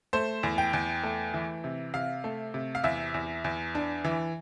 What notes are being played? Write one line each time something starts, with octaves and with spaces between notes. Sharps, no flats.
A3 C5
E2
G5
E2
A3
E3
C3
C3 F5
A3
C3
F5
E2 E5
E2
E2
D4
E3